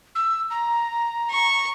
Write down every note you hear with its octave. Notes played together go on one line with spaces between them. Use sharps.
E6
A#5
C#6